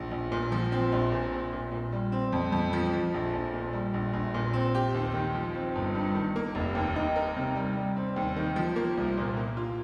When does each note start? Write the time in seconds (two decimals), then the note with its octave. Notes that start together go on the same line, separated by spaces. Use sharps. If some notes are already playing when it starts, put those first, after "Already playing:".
Already playing: A#1 F3
0.11 A#1
0.32 A#2
0.52 F3
0.72 C4
0.92 A#1
1.12 A#2
1.31 C4
1.53 A#2
1.72 A#2
1.92 G3
2.12 C4
2.32 F2
2.52 F2
2.73 F3
2.93 F3
3.14 A#1
3.33 A#1
3.54 A#2
3.73 G3
3.94 A#1
4.13 A#1
4.34 A#2
4.53 C4
4.75 G4
4.94 D#2
5.14 D#3
5.34 F3
5.54 C4
5.75 G1
5.95 G2
6.15 D#3
6.36 A#3
6.55 F1
6.75 D#2
6.96 D#4
7.16 A#4
7.36 C3
7.56 G3
7.75 G3
7.96 C4
8.16 D#2
8.36 D#3
8.56 F3
8.76 A#3
8.97 C2
9.17 A#2
9.37 A#3
9.57 F4